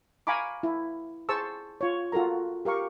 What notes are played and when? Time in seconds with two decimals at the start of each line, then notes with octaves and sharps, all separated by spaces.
0.27 F5 G#5 A#5 B5 C#6 D6
0.63 E4
1.29 G#4 C5 A5 C#6 E6
1.81 F4 C#5
2.12 F4 F#4 A4 A#4 A#5
2.65 G4 A#4 F5 C#6